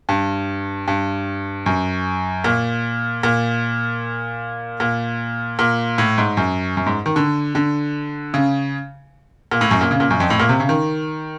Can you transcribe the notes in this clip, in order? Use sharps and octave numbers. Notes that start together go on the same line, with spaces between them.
G2
G2
F#2
A#2
A#2
A#2
A#2
A2
G#2
F#2
F#2
G#2
D#3
D3
D3
C#3
A#2
A2
F#2
A#2
C#3
A#2
F#2
F2
A2
A#2
C3
C#3
D#3